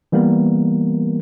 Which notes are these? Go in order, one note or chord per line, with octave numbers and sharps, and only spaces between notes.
E3 G3 A#3 B3 A#4